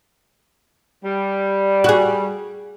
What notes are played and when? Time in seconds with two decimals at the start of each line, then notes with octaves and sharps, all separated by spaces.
1.05 G3
1.84 F#4 G#4